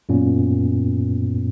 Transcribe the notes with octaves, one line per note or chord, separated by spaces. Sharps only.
F#2 A#2 B3 C#4